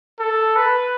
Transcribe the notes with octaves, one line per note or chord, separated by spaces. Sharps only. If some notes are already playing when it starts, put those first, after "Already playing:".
A4
B4